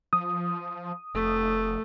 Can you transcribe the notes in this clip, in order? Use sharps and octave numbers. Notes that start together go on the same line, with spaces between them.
F3 D#6
F1 A3